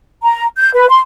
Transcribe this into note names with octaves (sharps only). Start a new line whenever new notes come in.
A#5
G6
B4
C6